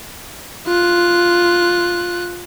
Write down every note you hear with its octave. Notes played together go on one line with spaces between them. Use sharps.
F4 F#6